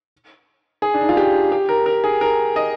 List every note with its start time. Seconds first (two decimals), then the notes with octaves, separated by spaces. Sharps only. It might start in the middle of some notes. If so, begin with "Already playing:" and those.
0.82 G#4
0.94 D4
1.01 D#4
1.09 F4
1.17 G4
1.52 G4
1.69 A#4
1.86 A#4
2.04 G#4
2.21 A#4
2.56 D#5